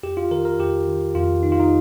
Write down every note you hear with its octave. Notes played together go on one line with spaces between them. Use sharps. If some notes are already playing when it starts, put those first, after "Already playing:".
F2 G4
F4
D#3 A#4
A#4
F2 G4
D#3
F2 F4
D#3 D#4
F4
D#4